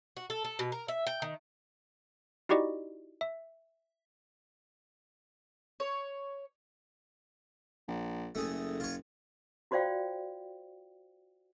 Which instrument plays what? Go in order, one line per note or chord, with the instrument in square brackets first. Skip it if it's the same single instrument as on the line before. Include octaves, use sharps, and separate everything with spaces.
[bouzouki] F#4
A4
A4
B2
A#4
E5
G5
D#3
[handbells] D#4 E4 F#4 G4 D5 D#5
E5
[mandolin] C#5
[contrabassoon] A#1
[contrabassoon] F#1 [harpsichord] A3 G#4
[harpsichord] F4 C#5
[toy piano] F4 F#4 C5 D5 F5 G5